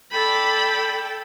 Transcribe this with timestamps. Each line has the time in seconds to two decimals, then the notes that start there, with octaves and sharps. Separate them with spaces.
0.12 A4 D5 G5 B5